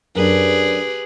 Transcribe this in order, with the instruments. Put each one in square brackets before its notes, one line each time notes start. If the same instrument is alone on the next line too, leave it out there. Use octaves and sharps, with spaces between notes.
[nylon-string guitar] F#2 D4 [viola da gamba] G4 G#4 B4